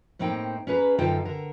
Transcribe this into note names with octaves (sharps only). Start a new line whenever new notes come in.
A2 A#3 C4 D#4 G5
C#4 G#4 B4 A#5
F#2 D3 D#4 F4 A4 G5
D3 A#4